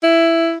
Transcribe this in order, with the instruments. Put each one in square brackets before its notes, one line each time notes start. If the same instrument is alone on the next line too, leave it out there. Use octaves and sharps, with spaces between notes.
[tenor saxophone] E4